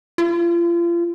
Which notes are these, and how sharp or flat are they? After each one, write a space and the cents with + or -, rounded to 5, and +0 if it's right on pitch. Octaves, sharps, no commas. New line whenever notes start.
F4 -35